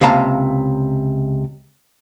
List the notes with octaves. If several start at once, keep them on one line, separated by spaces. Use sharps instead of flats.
C#2 C3 A#3 F5 A5 A#5